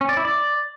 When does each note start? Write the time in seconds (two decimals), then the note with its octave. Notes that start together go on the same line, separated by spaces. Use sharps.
0.01 C#4
0.09 D5
0.17 E4
0.25 D5